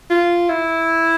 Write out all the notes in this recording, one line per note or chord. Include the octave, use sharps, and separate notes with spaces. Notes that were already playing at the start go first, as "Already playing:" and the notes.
F4
E4